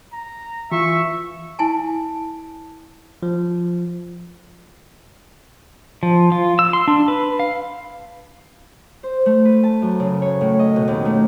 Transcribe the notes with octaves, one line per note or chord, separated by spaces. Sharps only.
A#5
E3 F4 E5 C#6
E4 G#5 A5
F3
F3
F4
E6
C6
D4
B4
F5
C5
A3
B4
A5
F#2
C#3
C#5
A2
D#5
B2
D#2
A3